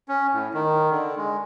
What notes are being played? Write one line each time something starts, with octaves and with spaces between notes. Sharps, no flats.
C#4
A2
D#3
D3
G#3